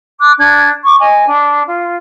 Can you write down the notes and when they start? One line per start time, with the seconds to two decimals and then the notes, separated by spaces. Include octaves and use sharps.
0.20 D6 F#6
0.39 D4 G#6
0.85 C#6 D6
0.99 D#5 G#5
1.26 D4
1.68 F4